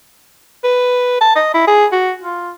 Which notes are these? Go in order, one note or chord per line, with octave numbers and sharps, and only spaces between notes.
B4
A5
D#5
E4
G#4
F#4
F4